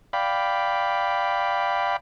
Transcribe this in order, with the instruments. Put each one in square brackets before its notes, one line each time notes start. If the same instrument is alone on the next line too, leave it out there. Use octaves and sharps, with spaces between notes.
[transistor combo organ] D5 F5 G5 B5